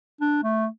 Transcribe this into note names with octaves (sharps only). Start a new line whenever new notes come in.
D4
A3